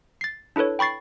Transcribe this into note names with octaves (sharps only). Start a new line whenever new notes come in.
A6 C7
D4 E4 A4 B4 C#5
G5 B5 C#6 A6 C7